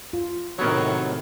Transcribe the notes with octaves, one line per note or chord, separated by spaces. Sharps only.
F4
A2 C3 D#3 F#3 B3 A#4 C#5